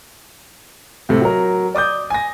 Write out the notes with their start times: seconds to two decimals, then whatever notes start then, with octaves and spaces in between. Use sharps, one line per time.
1.09 A2 C3 A4
1.22 F#3 A#4
1.75 D5 D6 D#6 G6
2.10 G#5 A#6